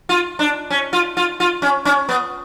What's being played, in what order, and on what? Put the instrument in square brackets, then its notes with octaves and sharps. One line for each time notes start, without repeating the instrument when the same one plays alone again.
[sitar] F4
D4
C#4
F4
F4
F4
C#4
C#4
B3